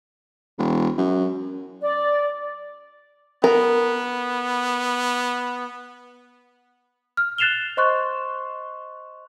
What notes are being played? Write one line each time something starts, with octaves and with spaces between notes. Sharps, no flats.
E1
F#2
D5
B3 A#4
F6
F#6 A6 C7 E7 F7 G7
C5 D#5 C6 C#6 F#6